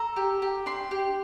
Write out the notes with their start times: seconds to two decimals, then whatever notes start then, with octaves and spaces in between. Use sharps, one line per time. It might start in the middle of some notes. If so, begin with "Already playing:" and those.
Already playing: A4 A#5
0.16 G4
0.42 G4
0.66 D4 C6
0.91 G4